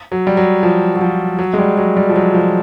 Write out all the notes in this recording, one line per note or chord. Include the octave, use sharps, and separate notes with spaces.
F#3
G3
F#3
F3
F#3
F3
F#3
G#3
G3
F#3
G3
F3
F#3
F3